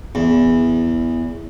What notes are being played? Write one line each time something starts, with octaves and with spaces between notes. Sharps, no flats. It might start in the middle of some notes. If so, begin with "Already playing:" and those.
E2